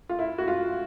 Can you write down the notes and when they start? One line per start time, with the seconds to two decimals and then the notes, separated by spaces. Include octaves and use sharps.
0.09 F4
0.19 E4
0.38 F#4
0.48 F4